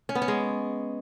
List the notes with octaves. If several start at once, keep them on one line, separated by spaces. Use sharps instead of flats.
C#4
B3
C#4
G#3